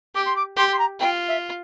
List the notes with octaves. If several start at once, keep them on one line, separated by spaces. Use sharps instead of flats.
G4 D6
C6
D6
G4 C6
C6
A#5
F4 G5
E5